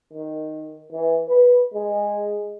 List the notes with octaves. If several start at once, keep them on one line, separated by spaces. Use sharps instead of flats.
D#3
E3
B4
G#3